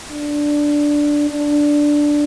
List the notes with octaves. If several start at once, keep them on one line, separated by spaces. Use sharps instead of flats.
D4
D4